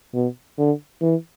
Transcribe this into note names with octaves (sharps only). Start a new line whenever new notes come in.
B2
D3
E3